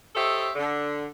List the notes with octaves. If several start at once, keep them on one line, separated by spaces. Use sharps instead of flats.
G4 A4 C5 C#5 D#5 E5
D3